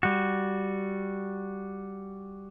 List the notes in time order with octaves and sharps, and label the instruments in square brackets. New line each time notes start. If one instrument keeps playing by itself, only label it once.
[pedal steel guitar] G3 F#4